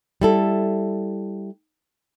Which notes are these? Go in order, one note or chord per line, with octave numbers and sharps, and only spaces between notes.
G3 E4 A4